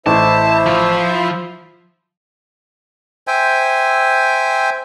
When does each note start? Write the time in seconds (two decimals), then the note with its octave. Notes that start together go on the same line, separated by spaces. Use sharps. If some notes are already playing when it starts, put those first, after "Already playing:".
0.06 A1 E4 C5 E5 A5
0.66 F3
3.27 C5 E5 G5 G#5